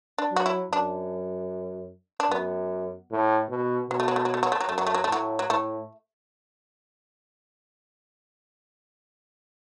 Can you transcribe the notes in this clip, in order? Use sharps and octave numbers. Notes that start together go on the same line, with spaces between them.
D4
F#3 F#4
E4
F#2 D4
D4
F#2 B3
A2
B2
B2 F#3
A3
F#3
A3
F#3
A3
F#3
A3
F#3
F#2 A3
F#3
A3
F#3
A3
A2 F#3
F#3
A2 A3